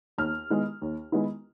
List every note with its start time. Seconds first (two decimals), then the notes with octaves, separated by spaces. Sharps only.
0.18 D#2 F6
0.50 D#3 G#3 B3 E4
0.82 D#2
1.12 D#3 G#3 B3 E4